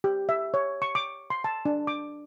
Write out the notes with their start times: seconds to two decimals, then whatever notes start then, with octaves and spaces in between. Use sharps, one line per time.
0.04 G4
0.29 E5
0.54 C#5
0.82 C#6
0.95 D6
1.30 C6
1.44 A5
1.65 D4
1.87 D6